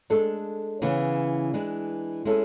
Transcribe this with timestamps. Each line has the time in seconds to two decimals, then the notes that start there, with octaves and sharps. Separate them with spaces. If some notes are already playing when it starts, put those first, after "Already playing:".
0.10 G#3 D4 A4
0.82 C#3 E3 B3
1.54 E3 G#3 D4
2.25 G#3 C#4 E4 A4